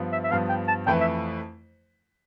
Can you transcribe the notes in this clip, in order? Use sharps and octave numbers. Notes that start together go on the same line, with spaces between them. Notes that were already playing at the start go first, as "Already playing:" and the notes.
Already playing: G2 F3 B3
E5
E5
G2 F3 B3 F5
G5
A5
F2 E3 A3 E4 B4 G5
E5